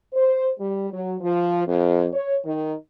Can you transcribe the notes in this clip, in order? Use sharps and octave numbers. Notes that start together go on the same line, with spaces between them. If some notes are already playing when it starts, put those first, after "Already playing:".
C5
G3
F#3
F3
F2
C#5
D#3